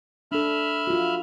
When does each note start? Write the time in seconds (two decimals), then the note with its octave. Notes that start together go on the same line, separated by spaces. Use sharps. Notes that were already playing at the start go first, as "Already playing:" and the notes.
0.32 D4 A4 E5 B5 F6
0.87 F4 F#4